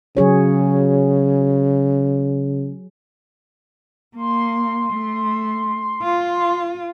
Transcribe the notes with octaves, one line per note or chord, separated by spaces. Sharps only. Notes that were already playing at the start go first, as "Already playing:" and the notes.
C#3 F#3 G#4 C#5
A#3 C6
A3
F4